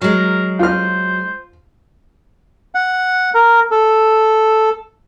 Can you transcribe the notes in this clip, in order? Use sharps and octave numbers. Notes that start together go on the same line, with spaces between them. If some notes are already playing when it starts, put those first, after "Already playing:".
F#3 G#3 A#4
F4 C5 F6
F#5
A#4
A4